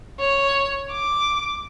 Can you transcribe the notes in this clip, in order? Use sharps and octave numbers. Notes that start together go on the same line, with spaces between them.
C#5
D6